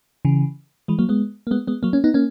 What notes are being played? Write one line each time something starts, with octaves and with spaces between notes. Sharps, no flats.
C#3 E3
E3 G#3
F#3 A#3
G#3 B3
A#3
G#3 B3
G#3 B3
F#3 A#3
A#3 C#4
B3 D#4
A#3 C#4